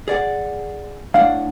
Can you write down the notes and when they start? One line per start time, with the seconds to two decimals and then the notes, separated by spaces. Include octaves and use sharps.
0.08 G#4 D5 F#5
1.14 A2 D4 F5 F#5